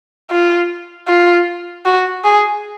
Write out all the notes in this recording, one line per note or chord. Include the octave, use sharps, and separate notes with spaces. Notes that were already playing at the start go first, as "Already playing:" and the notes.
F4
F4
F#4
G#4